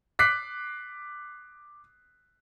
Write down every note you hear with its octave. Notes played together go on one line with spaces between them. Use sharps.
D6 F#6 B6 C7